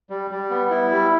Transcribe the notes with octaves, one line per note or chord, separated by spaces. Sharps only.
G3
G3
B3
E4
G3